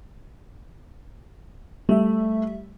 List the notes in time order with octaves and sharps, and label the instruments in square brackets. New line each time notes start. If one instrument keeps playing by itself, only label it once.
[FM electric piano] G3 E5 [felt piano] A3